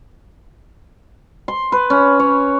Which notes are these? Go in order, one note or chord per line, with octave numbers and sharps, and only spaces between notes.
C6
B4
C#4
C#5